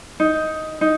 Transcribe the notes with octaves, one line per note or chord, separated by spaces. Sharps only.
D#4
D#4